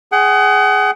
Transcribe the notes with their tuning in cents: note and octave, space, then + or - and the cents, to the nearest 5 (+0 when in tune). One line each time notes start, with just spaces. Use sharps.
G#4 +0 F#5 +35